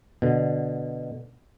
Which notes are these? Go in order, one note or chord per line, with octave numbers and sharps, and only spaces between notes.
B2 D3